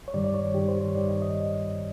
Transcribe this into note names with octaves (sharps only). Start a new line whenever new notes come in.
C#5
G2 D#3 G3 D5
D5
C#5
G2 D#3 G3 G4
C5
C#5
G2 D#3 G3 D5
D#5
D#5